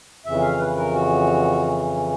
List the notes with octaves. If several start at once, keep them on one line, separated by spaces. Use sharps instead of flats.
F2 C#3 E3 E5
F5
B4
A#4
F#4